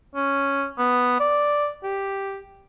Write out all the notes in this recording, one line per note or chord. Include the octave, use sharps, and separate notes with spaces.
C#4
B3
D5
G4